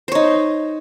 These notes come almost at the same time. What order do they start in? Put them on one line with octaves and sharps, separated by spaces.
C5 C#5 D#4